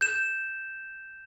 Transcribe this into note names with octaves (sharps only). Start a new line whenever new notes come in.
G6 E7